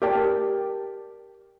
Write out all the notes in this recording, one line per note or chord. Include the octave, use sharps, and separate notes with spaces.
G4 A#4 D5 G5 A5